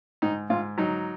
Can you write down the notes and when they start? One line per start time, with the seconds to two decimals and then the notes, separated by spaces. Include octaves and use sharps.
0.22 G#2 D#4
0.50 G#2 F4
0.78 F#3 D#4